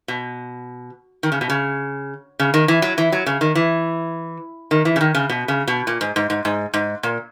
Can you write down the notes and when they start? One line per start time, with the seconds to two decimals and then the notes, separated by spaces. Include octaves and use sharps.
0.08 B2
1.23 D#3
1.32 C#3
1.41 B2
1.50 C#3
2.39 C#3
2.54 D#3
2.68 E3
2.82 F#3
2.98 E3
3.12 F#3
3.26 C#3
3.41 D#3
3.55 E3
4.71 D#3
4.85 E3
4.96 C#3
5.01 D#3
5.15 C#3
5.29 B2
5.48 C#3
5.68 B2
5.87 A#2
6.01 G#2
6.16 G#2
6.30 G#2
6.45 G#2
6.74 G#2
7.03 A#2